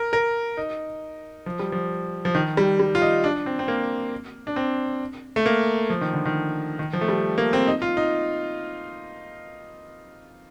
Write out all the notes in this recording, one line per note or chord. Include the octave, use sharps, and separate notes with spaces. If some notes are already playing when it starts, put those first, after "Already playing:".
Already playing: A#4
A#4
D#4
F3
G3
F3
F3
D#3
G3
G3
F4
D#4
D4
C4
C4
A#3
D4
C4
A3
A#3
F3
D#3
D3
D#3
D#3
F3
A3
G3
A#3
C4
D#4
F4
D#4